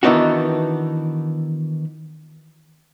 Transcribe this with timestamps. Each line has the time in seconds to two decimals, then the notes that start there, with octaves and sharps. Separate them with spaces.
0.03 D#3 E3 B3 D4 D#4 F#4